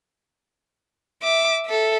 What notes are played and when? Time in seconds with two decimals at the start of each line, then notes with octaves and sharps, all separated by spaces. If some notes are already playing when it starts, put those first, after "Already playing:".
1.23 E5 D6
1.65 A4 E5